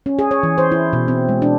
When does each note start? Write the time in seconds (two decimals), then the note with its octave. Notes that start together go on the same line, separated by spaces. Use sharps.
0.06 C#4
0.19 G#4
0.31 C#5
0.43 E3
0.58 C5
0.72 E4
0.93 B2
1.08 C4
1.29 G#3
1.42 D4